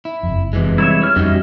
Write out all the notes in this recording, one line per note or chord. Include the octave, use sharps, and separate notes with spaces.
E4
F#1 F2
C3 E3 G#3
G3 E4 C#5 E5
C#5 F6
F2 G3 C#4 D#4 F#4 E5